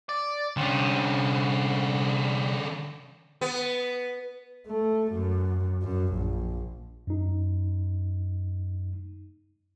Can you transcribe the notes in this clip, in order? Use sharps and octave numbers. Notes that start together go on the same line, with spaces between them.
D5
C2 D3 C#4
B3
A3
F#2
F#2
A#1
F#2 D#4